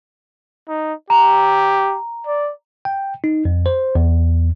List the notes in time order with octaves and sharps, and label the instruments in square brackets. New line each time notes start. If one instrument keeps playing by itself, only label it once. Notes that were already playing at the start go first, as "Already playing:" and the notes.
[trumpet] D#4
[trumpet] G4 [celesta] A#5
[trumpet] D5
[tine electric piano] G5
D#4
F2
C5
E2